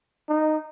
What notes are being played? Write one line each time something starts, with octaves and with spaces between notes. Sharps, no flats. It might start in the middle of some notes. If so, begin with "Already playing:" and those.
D#4